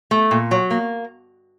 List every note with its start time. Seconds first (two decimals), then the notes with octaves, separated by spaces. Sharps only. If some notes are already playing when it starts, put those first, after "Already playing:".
0.11 A3
0.31 A#2
0.51 F#3
0.71 A#3